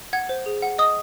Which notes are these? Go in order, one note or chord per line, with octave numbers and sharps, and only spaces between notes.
F#5 G#6
C5
G#4
F#5
D#5 D#6